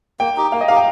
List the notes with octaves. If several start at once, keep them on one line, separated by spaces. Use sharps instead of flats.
A#3 G5
D#4 G4
A#3 F5
D#5
D#4 G4 F5
G5